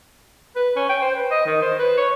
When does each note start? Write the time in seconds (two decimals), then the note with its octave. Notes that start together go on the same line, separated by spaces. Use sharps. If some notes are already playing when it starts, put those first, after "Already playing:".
0.56 B4
0.76 C#4
0.89 G5
1.02 C5
1.16 B4
1.31 D#5
1.46 D#3
1.62 C5
1.79 B4
1.97 C#5